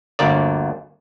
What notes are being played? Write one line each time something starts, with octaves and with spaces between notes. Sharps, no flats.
G1 D2 A#3 D5